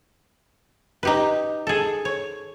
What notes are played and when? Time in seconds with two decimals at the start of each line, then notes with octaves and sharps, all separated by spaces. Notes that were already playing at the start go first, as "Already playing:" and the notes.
1.03 D#4 G4 B4
1.67 G#4 A4
2.05 C#5